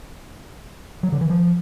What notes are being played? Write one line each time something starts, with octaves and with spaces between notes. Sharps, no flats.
F#3
D3
E3
F3